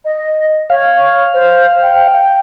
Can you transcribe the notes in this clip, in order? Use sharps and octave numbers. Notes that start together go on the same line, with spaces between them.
D#5
C#5 F5
C5
G5